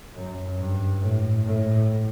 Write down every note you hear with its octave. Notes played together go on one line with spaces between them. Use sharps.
F#2
G2
A2
A2